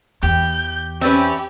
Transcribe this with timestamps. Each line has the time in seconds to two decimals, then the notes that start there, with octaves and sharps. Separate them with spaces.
0.23 E2 G4 G5 G6
1.01 C4 C#4 G4 B4 D5 E5